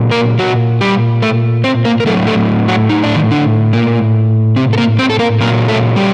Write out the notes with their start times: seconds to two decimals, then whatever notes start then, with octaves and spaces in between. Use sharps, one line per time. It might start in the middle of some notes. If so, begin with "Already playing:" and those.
Already playing: A#2 F#3
0.11 A#3 A#4
0.39 F#3 F#4
0.81 G3 G4
1.22 A3 A4
1.64 C4 C5
1.85 A#3 A#4
2.00 A#4
2.06 A2 F#3 A3 A4
2.27 A3 A4
2.68 F#3 F#4
2.89 D#4
3.03 D4
3.15 D#3 D#4
3.31 D3 D4
3.73 A#2 A#3
4.56 C3 C4
4.73 A4
4.78 A#3 A#4
4.99 C4 C5
5.10 A4
5.19 A#3 A#4
5.40 A#2 F#3 A#3 A#4
5.68 A3 A4
5.96 G3 G4